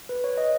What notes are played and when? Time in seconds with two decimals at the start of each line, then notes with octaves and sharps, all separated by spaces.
0.09 B4
0.24 C#5
0.37 D#5